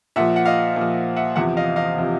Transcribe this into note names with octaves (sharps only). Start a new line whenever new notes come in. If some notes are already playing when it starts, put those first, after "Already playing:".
A#2 F3 E5 F#5
F#5
D#5 F5
A#2
F3
E5 F#5
E2 C3 F3 E5 F#5
D#5 F5
D#5 F5
C3 F3